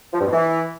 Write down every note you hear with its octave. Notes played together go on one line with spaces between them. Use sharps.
F3
G2
B2
E3